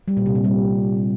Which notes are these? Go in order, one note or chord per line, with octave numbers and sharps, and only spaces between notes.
G3
A#2
C3
A#2
G3